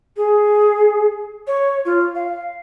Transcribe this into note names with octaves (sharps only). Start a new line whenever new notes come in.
G#4
C#5
F4
F5